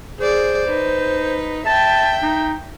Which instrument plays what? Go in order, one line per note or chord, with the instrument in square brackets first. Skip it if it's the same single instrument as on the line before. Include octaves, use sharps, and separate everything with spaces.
[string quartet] G#4 D5 [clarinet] C5
[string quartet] D#4 B4
[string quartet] E5 G5 [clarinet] A5
[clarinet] D#4